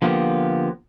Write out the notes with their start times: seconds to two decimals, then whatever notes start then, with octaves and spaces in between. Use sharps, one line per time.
0.02 D3 F3 A#3 B3 G4